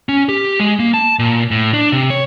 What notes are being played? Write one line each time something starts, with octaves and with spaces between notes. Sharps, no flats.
C#4
G4
G#3
A#3
A5
A#2
A2
D4
C3
C#5